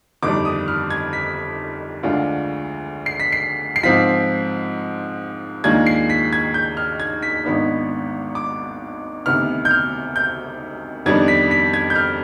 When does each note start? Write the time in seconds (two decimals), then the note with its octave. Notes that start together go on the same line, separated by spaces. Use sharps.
0.23 G1 F2 D#3 G3 D6
0.45 D#6
0.68 F6
0.90 G#6
1.13 B6
2.03 D2 D3 G#3 D4 F4
3.06 C7
3.20 B6
3.32 C7
3.76 C7
3.83 G#2 F3 C4 F4 B6
5.64 D#2 D#3 G#3 D4 F4 G#6
5.86 C7
6.10 B6
6.33 G#6
6.54 G6
6.77 F6
7.00 G#6
7.22 B6
7.45 G#1 G#2 D#3 B3 D4
8.35 D6
9.26 D2 C3 D#3 B3 F6
9.65 G6
9.71 F6
10.16 G6
11.06 F2 D#3 G3 B3 D4 G#6
11.28 B6
11.51 B6
11.74 G#6
11.90 G6
11.96 F6